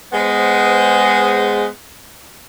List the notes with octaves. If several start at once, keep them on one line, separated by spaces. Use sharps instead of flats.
G#3 B3 C5